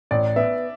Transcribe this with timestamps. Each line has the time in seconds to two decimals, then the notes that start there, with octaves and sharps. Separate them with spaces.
0.11 A1 D5
0.36 B3 E5